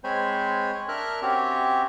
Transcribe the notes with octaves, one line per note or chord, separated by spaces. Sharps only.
G#3 C4 C5 C#5 G#5 B5
D4 A#4 E5 A#5 F6 F#6
C4 C#4 F#4 G4 C#5 E5